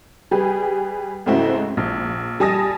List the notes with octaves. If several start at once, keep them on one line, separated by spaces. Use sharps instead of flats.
G3 G4 G#4 B4
G#2 C#3 A3 C4 E4 F#4
A#1
G3 G#5 A5 D#6 A#6